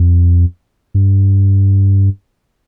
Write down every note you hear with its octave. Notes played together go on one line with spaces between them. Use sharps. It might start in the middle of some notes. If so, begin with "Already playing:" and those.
Already playing: F2
G2